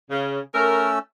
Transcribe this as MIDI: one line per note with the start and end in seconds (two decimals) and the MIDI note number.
0.11 0.40 49
0.54 0.99 57
0.54 0.99 61
0.54 0.89 70
0.54 0.99 88